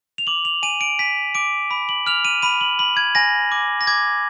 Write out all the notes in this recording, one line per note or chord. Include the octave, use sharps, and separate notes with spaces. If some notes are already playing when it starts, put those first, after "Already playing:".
F7
D6 F#7
F7
G#5 D#7
D7
G#5 B6
D6 D7
B5
F#7
F6 F7
D#7
B5 D#7
F#7
B5 F#7
G#6
G#5 A#6
D6
A#6
D6 G#6